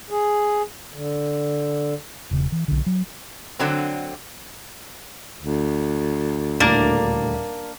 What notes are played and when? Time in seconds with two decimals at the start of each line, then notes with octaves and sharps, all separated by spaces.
0.10 G#4
0.94 D3
2.31 E1 C#3
2.52 E3
2.68 B1 D3
2.86 F#3
3.59 D3 F#3 C4
5.42 D2
6.60 D#1 A2 A#3 D4 A#4